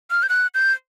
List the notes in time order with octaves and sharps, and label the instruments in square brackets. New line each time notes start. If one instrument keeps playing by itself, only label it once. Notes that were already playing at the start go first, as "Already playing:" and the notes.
[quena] F6
G6
F#6
G6